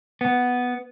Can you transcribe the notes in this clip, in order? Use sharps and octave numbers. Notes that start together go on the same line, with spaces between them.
B3